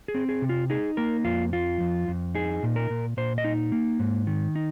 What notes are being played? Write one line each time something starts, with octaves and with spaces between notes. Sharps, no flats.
G#4
C4
G#4
C3
F4
D#4 G#4
A#3 A#4
F2 F4
F3 F4
F2
F2
D#4 G#4
A#2
A#4
A#2
A#2 C5
D#5
D#4
A#3
G#2
D#3
D#4